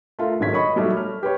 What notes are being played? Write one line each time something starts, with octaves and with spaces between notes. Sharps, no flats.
A3 F4 A#4
G#1 G#2 D#3 F#3 G#6 B6
C#5 D#5 B5 C#6
F#3 G3 A3 D#4
F6
G4 B4 C#5